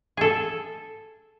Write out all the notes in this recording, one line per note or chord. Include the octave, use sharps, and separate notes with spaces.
G#4 A4